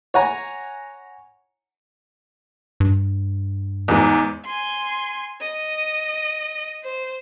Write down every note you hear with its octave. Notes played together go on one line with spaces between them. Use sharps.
C#5 F#5 G#5 A#5
G2
E2 G#2
G#5 C6
D#5
C5